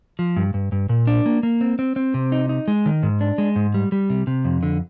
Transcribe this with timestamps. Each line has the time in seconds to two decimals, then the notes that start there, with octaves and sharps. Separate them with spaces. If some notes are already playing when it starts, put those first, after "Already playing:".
0.19 F3
0.36 G2
0.54 G2
0.72 G2
0.89 A#2
1.07 D4
1.26 A#3
1.43 A#3
1.61 C4
1.79 C4
1.96 C4
2.14 C3
2.32 D#4
2.49 D#4
2.68 G#3
2.86 D#3
3.03 G#2
3.21 D4
3.38 G#3
3.56 G#2
3.74 G3
3.92 G3
4.10 C3
4.27 C3
4.45 F2
4.63 D3